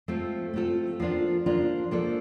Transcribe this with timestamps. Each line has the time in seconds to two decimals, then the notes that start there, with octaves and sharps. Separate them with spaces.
0.08 A3 C4 F4 A4
0.54 A3 C4 F4 A4
1.00 F3 A#3 D4 F4
1.46 F3 A#3 D4 F4
1.91 F3 A#3 D4 A4